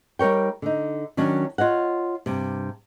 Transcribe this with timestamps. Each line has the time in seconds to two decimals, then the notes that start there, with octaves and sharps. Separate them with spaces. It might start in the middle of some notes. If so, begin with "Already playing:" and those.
0.19 G3 D#4 A#4 C#5 G5
0.62 D3 D#4
1.17 D#3 F#3 C#4 D4
1.58 F4 C#5 D#5 F#5
2.26 G2 C3